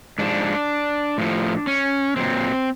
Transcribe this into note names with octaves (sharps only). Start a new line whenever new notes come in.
G#2 F3 D4
A2 F3
C#4
A#2 F#3 C4